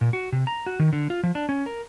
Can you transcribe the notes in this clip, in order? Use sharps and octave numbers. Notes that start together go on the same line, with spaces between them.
A#2
F#4
C3
A#5
F#4
D#3
D3
F4
F3
D4
C#4
A#4